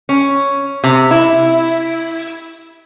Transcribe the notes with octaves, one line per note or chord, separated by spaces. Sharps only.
C#4
C3
E4